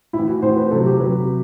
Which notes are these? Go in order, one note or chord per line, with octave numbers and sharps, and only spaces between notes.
A2 E3 E4
F#4
A2 E3 C5
B4
C3 F#3 A4
G4
C3 F#3 B4